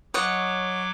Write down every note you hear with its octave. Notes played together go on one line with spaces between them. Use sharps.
F#3 C#5 D#5 F#5 D6